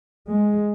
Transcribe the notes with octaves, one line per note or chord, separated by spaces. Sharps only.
G#3